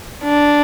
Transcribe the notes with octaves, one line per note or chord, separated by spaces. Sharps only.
D4